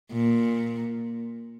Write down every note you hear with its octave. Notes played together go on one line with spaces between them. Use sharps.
A#2